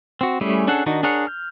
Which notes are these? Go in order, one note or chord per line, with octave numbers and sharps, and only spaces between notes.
C4 F#4
G3 A3 C#4 E4 G#4
C#4 D4 G#4 A4 F#5
D#3 D4 D#4 F#4
D4 G#4 A#4 C#5 F#5
F6 G6